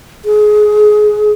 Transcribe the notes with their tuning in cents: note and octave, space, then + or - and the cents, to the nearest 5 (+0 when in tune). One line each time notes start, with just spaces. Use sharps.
G#4 +20